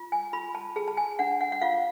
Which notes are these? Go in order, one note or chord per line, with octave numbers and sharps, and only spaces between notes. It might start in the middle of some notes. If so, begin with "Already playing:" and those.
Already playing: F4
G#5
F4 B5
A5
G#4 A5
A5
G#5
D4 F#5
F#5
F#5
F4 F5